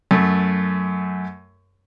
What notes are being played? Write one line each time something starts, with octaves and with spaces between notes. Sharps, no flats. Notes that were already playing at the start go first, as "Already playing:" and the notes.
F#2 A3